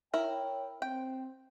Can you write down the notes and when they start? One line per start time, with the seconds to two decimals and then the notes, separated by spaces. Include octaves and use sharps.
0.14 E4 A#4 C#5 G5
0.82 C4 G5